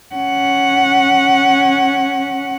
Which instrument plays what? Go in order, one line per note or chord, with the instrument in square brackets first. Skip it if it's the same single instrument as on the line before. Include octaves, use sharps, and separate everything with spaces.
[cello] C#4 F#5